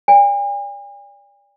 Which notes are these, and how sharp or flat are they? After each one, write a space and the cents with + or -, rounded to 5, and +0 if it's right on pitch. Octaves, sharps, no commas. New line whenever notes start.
D5 -30 G#5 -45